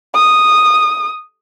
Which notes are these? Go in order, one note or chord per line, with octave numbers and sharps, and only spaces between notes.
D#6